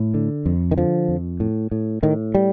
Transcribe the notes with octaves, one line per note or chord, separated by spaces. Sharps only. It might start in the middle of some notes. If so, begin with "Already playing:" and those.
Already playing: A2
D3
F2
D#3
D3 F3
F2
A2
A2
A2 D#3
G3